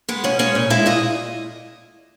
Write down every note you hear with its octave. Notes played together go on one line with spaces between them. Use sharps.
G#3 B3
B2 C#4
G#3 C#4
A#2
G#3 E4
A#2 D#5